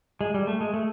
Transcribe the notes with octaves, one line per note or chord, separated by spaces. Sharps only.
G#3
G3
A3
G#3
A3